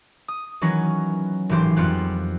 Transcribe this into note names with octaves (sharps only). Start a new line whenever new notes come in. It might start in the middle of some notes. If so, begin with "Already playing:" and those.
D#6
D#3 E3 F#3 C#4 A#4 B4
G#1 A2 E3 G4 C5 C6
F2 G3 B3 F4 G4 F#6